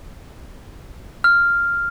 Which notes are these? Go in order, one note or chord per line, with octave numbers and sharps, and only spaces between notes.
F6